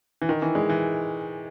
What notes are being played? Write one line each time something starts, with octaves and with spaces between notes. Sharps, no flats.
E3
D#3
E3
G#3
E3